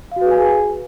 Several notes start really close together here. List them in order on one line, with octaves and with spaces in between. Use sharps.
F5 F#4 B4 G#4 G#5